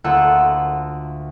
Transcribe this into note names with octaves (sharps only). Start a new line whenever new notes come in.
D2 A#3 F4 F#5 E6 F#6